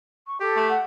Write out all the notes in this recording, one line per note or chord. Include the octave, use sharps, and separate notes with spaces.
C#6
G4 A4
A3
F#5